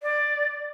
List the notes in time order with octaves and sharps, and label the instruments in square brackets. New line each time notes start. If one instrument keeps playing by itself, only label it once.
[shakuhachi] D5